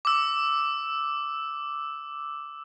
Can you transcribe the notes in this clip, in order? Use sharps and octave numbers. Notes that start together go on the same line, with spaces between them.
D6 E6